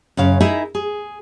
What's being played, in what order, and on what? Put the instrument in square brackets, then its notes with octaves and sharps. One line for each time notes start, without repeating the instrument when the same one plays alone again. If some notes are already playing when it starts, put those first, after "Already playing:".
[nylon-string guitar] F#2 C#3 F5
D#4 E4 G#4 A#4 D#5 E5
G#4